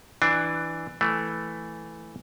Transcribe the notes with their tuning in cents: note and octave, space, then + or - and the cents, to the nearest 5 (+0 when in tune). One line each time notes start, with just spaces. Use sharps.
E3 +0 D4 +15
E3 +0 A3 +0